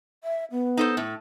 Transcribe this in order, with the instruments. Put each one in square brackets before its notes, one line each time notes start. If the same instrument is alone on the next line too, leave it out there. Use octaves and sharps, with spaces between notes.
[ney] E5
B3
[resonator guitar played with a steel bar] D#4 A4 C5
A2